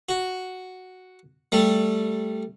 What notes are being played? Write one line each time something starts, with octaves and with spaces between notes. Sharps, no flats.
F#4
G3 A3